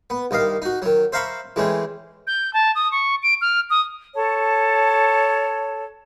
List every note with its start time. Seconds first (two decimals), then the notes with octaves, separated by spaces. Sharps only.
0.10 B3
0.31 C2 D#3 D#5 F5
0.62 D#4 F#4
0.82 D#3 F#3
1.13 C5 E5 F5 A#5 B5 C#6
1.56 E3 G#3 A3 C4 C#4
2.27 G6
2.53 A5
2.75 D#6
2.92 C#6
3.23 D7
3.41 F6
3.70 D#6
4.14 A4 C#5 A5